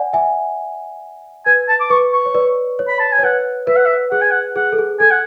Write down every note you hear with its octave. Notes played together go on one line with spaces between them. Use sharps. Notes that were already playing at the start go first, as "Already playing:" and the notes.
Already playing: D5 F#5 G#5
E5 G#5
B4 G#5
A5
D6
B4 C#6
C#6
C#5
B4 D5
C#5
B5
A5
G#5
C#5
B4 F#5
B4 E5
F#5
E5
G#4 F#5
G#5
F#5
G#4 F#5
A4
G#4
A4 G#5
F#5